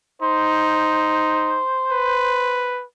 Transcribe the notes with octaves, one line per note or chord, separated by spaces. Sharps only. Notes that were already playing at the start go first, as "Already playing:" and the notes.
D#4 C5
B4